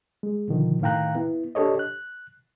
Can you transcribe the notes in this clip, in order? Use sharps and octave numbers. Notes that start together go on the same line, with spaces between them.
G#3
B2 D3 D#3 F3
A2 D#3 F5 G5 A#5 F#6
B3 E4
D4 G4 A4 C#5 D#5
F#6